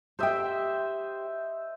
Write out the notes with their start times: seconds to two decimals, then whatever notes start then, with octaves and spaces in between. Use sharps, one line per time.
0.19 G4 C5 D#5 E5 G5